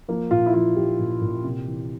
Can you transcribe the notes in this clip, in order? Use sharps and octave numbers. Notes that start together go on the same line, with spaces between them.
F3 A#3
A#2 F4
E4
F3 F4
F3 G4
A#2
A#2
C3
E3